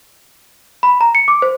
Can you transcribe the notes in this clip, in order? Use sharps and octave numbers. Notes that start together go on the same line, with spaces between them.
B5
A#5
C#7
D6
C5